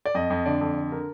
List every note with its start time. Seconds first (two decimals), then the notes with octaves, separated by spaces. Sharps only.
0.05 D5
0.15 F2 D#5
0.30 F2
0.46 D3 D5
0.61 F2
0.76 D3
0.91 D3 A#4